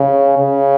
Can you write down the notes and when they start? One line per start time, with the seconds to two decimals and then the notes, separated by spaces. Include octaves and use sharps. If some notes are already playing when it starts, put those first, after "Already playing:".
Already playing: C#3
0.38 C#3